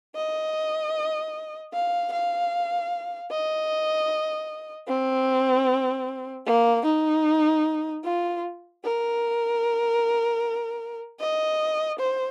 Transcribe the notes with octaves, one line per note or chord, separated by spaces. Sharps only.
D#5
F5
F5
D#5
C4
A#3
D#4
F4
A#4
D#5
C5